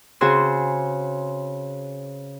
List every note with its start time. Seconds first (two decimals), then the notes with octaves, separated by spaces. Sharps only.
0.21 C#3 C4 F#4 G#4 C5 C6